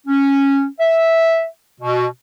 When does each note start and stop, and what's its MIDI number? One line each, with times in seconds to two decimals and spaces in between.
0.07 0.66 61
0.80 1.45 76
1.81 2.06 47